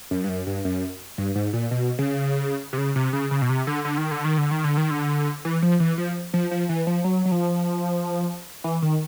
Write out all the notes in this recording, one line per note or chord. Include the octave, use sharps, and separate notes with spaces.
F#2
G2
F#2
G2
F#2
G2
G#2
A#2
B2
C#3
C3
C#3
C3
C#3
C#3
B2
C3
D3
D3
D#3
D3
D#3
D3
D#3
D3
D#3
D3
E3
F3
E3
F3
F3
F3
E3
F3
F#3
F#3
F3
E3
D#3